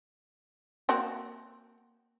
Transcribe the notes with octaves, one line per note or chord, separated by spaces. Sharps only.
A#3 C4 F#4